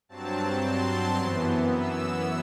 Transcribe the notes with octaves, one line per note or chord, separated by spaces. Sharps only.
G2 F#3 C4 A5
C6
F#2 E3 B3
E6